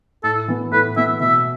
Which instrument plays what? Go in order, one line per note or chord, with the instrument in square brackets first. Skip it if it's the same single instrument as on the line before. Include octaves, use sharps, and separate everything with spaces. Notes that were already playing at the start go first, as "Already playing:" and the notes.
[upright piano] A2 [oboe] A4
[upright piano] E3 B3
[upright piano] A2 [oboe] B4
[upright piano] E3 B3 [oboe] E5
[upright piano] B2 [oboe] E5